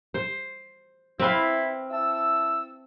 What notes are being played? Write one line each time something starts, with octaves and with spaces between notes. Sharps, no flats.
C5
C4 E4 B4 F5
E4 A5 E6